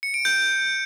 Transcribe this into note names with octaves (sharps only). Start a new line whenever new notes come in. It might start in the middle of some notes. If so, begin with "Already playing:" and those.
C#7
D7
G6